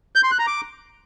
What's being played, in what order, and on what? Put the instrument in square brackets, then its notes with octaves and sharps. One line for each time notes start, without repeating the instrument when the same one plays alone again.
[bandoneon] G6
C6
F#6
A#5
D6